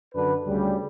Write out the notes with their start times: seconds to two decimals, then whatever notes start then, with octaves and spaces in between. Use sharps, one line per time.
0.15 F#2 D3 D4 B4
0.46 D2 C#3 G3